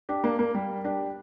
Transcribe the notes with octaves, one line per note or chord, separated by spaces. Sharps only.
D4 G4
A#3 D4
A#3
G3
D4 G4